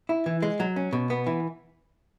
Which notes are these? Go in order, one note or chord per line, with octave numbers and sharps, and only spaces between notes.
E4
E3
G#3
F#3
C#4
B2
B3
E3